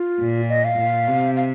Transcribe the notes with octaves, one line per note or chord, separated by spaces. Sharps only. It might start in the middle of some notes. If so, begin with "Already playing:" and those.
Already playing: F4
A#2
D#5
F5
A#2
C3
F5